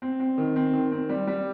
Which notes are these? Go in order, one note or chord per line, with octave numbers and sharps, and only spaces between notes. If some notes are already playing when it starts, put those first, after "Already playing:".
C4
C4
D#3
C4
D#3
C4
G3
G3